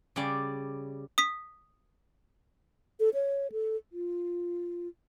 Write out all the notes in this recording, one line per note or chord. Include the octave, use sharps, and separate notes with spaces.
C#3 G3 D5
D#6 B6
A4
C#5
A4
F4